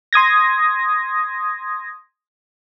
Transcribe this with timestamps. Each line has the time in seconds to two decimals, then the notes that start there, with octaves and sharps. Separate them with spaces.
0.13 C6 D#6 G#6 A#6